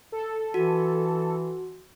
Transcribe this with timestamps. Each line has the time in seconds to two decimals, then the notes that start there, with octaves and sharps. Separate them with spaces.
0.12 A4
0.54 E3 F#4